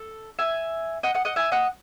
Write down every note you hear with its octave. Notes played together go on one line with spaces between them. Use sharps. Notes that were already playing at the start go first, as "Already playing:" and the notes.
Already playing: A4
E5 G#5
D#5 F#5
D#5 F#5
D#5 F#5
E5 G#5
D#5 F#5